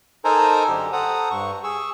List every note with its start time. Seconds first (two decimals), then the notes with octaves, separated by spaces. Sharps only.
0.24 D#4 A4 A#4 C5 G#5 A#5
0.68 F#2 D3 G4
0.92 A4 C5 F#5 A#5 D#6
1.31 G2 C#6
1.64 G#4 C#6 E6